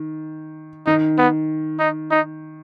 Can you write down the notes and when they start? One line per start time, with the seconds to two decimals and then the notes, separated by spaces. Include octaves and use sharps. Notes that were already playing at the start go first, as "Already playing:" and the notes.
Already playing: D#3
0.86 D#3 D#4
1.18 B3
1.79 D#4
2.11 D#4